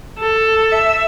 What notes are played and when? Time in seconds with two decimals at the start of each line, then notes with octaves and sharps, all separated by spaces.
0.19 A4
0.71 E5